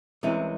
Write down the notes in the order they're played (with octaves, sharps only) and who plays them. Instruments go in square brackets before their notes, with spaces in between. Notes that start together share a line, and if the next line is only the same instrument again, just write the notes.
[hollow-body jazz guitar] C2 C3 E3 G#3 C#4